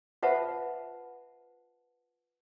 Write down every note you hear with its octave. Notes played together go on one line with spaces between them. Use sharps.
F4 B4 C5 E5 F#5 A5